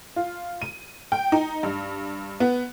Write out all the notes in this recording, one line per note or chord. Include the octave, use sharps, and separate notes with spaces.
F4
D#7
G5
D#4
G2
B3